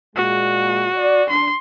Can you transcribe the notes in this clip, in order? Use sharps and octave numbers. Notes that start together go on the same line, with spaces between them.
A#2 G#3 F#4
D5
D4 C6